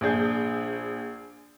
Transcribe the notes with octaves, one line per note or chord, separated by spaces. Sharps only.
A#1 D4 G#4 G6